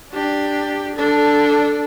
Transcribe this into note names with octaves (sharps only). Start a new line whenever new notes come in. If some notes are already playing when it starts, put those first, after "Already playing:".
D4 G4
D4 A4